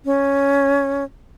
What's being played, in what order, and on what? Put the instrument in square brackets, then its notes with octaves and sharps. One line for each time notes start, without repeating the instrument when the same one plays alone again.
[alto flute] C#4